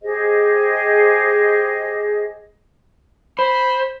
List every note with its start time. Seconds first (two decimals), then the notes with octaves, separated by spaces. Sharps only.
0.02 G4 G#4 C5 D#5
3.39 C5 B5